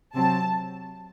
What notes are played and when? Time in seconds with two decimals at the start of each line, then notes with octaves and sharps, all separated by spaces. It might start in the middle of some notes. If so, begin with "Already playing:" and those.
0.15 C3 F#3 C4 A5